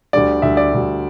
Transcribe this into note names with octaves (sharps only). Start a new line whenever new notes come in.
D2 D3 G3 D5
D2 D3 G3 E5
D5
D2 D3 G3